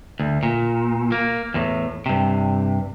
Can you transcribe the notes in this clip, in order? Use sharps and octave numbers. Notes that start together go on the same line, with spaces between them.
D2
A#2
A#3
E2 A2
G2 C3